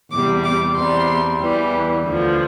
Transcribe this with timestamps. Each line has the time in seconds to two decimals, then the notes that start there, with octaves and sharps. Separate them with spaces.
0.12 E2 C3 G3 D6
0.44 D6
0.76 E2 C3 G3 C6
1.40 E2 E3 G3
2.05 D2 D3 F3